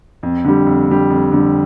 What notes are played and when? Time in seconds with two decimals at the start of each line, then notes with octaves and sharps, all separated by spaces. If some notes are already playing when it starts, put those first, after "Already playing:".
0.23 F2
0.45 D3 G3
0.67 F2
0.88 D3 G3
1.10 F2
1.32 D3 G3